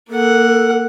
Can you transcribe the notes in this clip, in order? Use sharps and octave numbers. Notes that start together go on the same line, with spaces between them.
A#3 A4 F#5